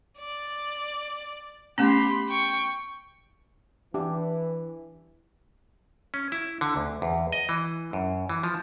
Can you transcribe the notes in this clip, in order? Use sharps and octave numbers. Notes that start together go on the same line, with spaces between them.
D5
A3 B3 C#4 G4 B5 C6
G5 C#6
E3 D4 G4
C#4
E4
D3
D2
E2
D#5
E3
F#2
E3
F3